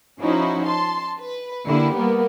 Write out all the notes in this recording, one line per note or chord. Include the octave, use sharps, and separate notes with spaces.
F3 C#4 D#4 E4 F#4
A5 C6
B4
D3 A#3 E4 G4
G3 A#3 B3